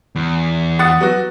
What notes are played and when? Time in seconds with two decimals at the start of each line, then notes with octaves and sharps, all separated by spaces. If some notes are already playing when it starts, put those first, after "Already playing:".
0.15 E2
0.79 F#5 D#6 A6
1.00 F#3 B3 F#4